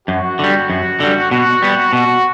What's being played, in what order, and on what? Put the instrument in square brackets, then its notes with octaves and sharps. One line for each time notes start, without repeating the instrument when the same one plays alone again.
[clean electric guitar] F#2 [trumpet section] F#4
[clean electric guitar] D3 G3
F#2
D3 G3
[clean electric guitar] B2 [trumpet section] F#4
[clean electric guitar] G3 B3
[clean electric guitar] B2 [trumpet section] F#4